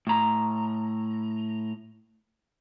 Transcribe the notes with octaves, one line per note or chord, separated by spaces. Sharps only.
A2 A#5